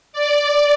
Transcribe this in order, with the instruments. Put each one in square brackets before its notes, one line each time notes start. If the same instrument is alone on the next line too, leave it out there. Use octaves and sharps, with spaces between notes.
[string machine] D5